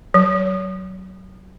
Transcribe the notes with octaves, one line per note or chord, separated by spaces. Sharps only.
F#3